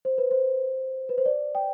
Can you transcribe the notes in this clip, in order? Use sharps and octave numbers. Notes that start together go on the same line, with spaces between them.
C5
B4
C5
B4
C5
D5
G5